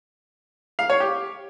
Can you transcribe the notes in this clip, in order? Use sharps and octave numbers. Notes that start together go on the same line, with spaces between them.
F5
C#5
G4